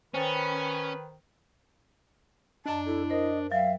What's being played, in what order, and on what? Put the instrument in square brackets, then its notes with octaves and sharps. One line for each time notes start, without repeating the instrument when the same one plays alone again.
[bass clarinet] D#3 [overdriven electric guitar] C#4 [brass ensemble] B4 [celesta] C5 G5 A6
[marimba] F#2 D#5 [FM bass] D4 [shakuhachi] A5
[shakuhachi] E4 [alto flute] A4
[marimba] A#4 C5 [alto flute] D#5
[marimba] F#3 G5 [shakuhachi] E5 [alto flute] F5